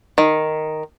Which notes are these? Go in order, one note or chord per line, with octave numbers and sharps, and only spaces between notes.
D#3